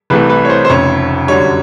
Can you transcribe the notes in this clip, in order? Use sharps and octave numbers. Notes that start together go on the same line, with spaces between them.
C2 C3 E3 A3 B4
B4
C#5
C5
C5
F1 F2 C#3 C#5
F#2 D3 G3 C#5